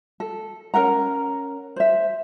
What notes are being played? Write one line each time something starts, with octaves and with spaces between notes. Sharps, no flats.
A4
C#4 A#4 F#5 A#5
C5 E5